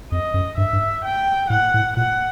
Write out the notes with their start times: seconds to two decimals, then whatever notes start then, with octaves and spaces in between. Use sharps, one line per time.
0.11 F2 D#5
0.34 F#2
0.57 G2 E5
0.73 G2
1.04 G5
1.50 A2 F#5
1.74 A2
1.96 A#2 F#5